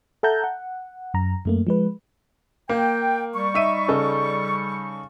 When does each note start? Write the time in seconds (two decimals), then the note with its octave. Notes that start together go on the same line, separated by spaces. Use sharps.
0.23 A4 E5 F#5 A5 A#5 G6
0.44 F#5
1.14 F#2 A#5
1.45 F#2 A3 A#3
1.67 F3 G#3 B4
2.69 A#3 G5
3.35 G3 C#6
3.54 D#4 E5 D#7
3.88 C#3 D#4 A4